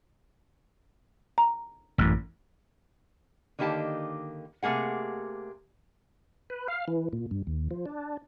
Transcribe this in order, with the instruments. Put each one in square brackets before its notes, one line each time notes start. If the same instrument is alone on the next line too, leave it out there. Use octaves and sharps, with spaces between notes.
[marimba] A#5
[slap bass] A1 F#2
[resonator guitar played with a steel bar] D3 D#3 A#3 D#4 G4 A5
C3 A3 A#3 G#4 F#5
[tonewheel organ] B4
F5
E3
A#2
G2
D#2
F3
D4